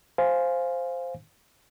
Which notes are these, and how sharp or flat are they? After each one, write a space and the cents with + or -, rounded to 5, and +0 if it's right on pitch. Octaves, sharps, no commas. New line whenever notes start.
C5 +0 F5 +0 G#5 +0